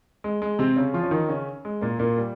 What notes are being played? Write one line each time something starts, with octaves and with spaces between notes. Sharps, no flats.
G#3
G#3
C3 C4
C#3 C#4
F3 F4
C#4
D#3 D#4
C#3 C#4
G#3
A#2 A#3
A#2 A#3
G3